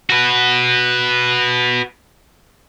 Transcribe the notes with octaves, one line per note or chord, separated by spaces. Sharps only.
F#4 B4